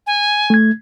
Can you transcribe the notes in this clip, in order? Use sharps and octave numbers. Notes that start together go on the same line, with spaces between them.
G#5
A3 G#6